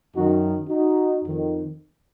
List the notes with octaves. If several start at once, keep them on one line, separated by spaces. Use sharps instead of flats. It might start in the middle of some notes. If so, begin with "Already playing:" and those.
F#2 D#3 D#4 F#4
D#4 F#4
F2 D#3